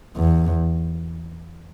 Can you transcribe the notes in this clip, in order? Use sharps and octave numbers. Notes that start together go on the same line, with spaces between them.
E2